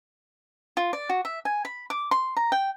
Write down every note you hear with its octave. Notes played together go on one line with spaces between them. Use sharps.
F4
D5
F#4
E5
G#5
B5
D6
C6
A#5
G5